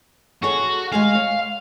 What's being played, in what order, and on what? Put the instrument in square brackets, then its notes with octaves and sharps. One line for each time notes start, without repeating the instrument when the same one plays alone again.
[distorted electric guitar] F#4 [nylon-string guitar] G#4 A4 C#5
[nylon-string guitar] G#3 G#4 G#5 [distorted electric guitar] F5
[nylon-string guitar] C#5